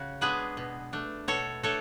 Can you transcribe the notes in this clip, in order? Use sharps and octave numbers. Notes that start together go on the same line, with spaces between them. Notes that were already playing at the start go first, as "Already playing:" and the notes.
Already playing: C#3 F#4
G#3 B3 D4 G#4 B4
B2
A3 D4
B2 A4 C#5
A3 D4 A4 C#5